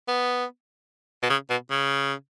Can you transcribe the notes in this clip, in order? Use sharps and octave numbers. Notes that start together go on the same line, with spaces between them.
B3
B2
C#3
B2
C#3